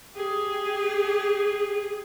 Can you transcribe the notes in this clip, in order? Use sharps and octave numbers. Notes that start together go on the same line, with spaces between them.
G4 G#4